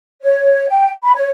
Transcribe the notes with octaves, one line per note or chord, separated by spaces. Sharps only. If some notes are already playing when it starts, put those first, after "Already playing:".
C#5
G5
B5
C#5